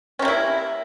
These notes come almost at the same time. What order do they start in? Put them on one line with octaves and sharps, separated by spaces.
C#4 C3 A#3 E4